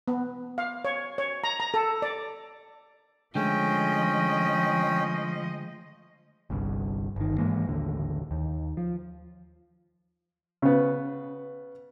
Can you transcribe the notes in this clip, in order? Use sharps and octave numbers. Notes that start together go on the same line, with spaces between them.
B3
F5
C#5
C#5
A#5
A#5
A4
D5
D3 F3 G#3 A3 C#4 D#5 G5
G1 C2 G2
G1 D#3
G#2 E3 G#3 A#3
A1 D#2 D3
D#2
F3
C#3 B3